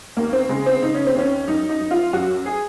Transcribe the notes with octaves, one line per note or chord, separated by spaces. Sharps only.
D#2 A#3
C4
C#3 G#3
C4
C#3 D#4
C#4
C4
D#2 C#4
F#2 D#4
D#4
F#2
F4
F#2 F#4
G#4